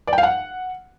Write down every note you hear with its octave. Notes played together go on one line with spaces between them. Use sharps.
D5
G5
F5
F#5